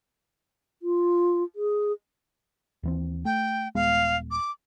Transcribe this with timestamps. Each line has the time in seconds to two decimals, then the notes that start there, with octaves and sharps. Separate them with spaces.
0.82 F4
1.56 G#4
2.83 D#2 E3 C4
3.25 A3 G5
3.75 D#1 G#3 B3 F5
4.31 D6